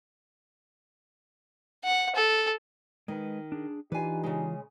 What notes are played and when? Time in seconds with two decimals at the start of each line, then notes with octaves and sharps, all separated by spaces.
1.85 F#5
2.16 A4
3.08 D#3 G#3 B4
3.52 D4 G#4
3.92 E3 D4 D#4 F4 G4 B4 G#5
4.23 C#3 G#3